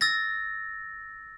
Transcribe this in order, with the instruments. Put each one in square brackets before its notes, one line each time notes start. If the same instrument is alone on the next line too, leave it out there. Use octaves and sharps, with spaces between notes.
[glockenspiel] E6 A6 A#6